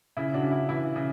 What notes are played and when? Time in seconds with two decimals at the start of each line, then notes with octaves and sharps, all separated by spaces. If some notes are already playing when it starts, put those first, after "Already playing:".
0.17 C#3 E4
0.34 D4 F#4
0.43 C#3
0.51 E4
0.69 E3 E4
0.96 C#3